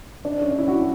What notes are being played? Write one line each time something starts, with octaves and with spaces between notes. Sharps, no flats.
D4
C#4
D4
E4
F#4